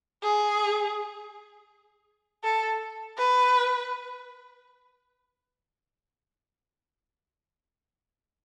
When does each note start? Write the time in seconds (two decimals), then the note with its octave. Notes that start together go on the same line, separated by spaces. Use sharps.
0.23 G#4
2.43 A4
3.18 B4